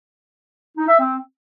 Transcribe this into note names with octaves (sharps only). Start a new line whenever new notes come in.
D#4
E5
C4